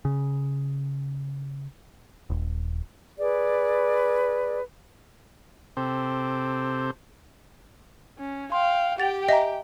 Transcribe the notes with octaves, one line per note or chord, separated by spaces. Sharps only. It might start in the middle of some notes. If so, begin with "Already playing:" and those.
C#3
D#1
G#4 B4 D5
C3 C4 G4 A4 C5
C#4
F5 G5 C6
G4 F#5 G5 A6 F7
D#5 E5 G#5 A#5